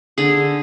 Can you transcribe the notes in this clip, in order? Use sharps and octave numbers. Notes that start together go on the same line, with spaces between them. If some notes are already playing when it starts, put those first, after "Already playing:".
D3 G#4